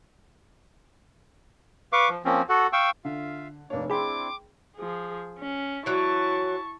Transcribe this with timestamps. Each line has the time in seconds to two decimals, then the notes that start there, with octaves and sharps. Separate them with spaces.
1.93 B4 F5 C#6 D6
2.09 F3
2.25 F3 A#3 C4 C#4
2.49 F#4 A4 F#5
2.73 F5 G5 C#6 E6
3.05 D3 F4 E5 F5
3.70 F1 A#3 D4 C#5
3.90 C4 D4 E4 G#4 G5 B5 C6 D6
4.77 F3 G#4
5.39 C#4
5.86 E3 F#3 E4 A5 C#6